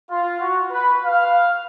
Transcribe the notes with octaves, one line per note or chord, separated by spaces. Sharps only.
F4
F#4
B4
F5